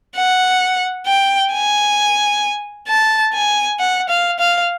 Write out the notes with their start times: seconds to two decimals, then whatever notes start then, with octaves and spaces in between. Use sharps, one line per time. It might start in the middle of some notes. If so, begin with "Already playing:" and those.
0.16 F#5
1.07 G5
1.53 G#5
2.89 A5
3.34 G#5
3.80 F#5
4.09 F5
4.40 F5